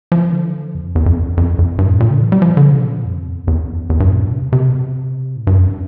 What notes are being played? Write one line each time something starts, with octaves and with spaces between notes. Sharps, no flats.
F3
D3
E2
F2
E2
F2
E2
F2
F2
G2
A2
A#2
D3
E3
G3
F3
D3
C3
A#2
F2
E2
E2
F2
E2
G2
A#2
C3
C3
A2
G2
F2